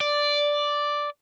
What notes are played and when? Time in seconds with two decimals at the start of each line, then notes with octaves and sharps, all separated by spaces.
0.01 D5